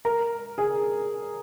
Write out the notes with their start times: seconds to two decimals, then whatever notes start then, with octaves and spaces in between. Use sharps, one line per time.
0.05 A#4 A#5
0.58 G#4 G#5